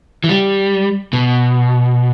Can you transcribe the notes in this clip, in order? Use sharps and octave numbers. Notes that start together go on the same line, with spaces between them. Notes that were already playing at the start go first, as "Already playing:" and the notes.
E3
G3
B2